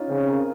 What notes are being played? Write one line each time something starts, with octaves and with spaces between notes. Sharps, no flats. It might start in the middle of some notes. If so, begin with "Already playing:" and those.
Already playing: C#4 D#4 F4
C#3 C4
A#4